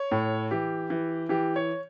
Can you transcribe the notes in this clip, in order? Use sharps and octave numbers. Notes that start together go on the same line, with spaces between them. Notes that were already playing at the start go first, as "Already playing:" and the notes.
Already playing: C#5
A2
E3 G4
E3
E3 G4
C#5